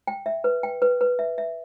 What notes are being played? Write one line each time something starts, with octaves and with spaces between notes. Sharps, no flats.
G5
E5
B4
G5
B4
B4
E5
E5